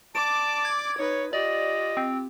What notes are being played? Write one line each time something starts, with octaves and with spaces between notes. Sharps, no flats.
D5 A5 D6 D7
G#6
D#4 B4 C#5
F4 G4 D5 D#5
C4